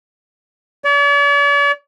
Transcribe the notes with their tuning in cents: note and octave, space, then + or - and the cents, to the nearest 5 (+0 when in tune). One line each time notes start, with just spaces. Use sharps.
D5 -45